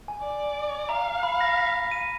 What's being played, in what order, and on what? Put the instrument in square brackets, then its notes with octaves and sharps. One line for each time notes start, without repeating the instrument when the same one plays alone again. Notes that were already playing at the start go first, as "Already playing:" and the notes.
[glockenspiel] G#5
[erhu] D5
[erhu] F5 [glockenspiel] A#5
[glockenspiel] B5
A#6
B6
D#7